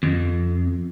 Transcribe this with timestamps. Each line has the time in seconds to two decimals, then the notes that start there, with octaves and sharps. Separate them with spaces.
0.03 F2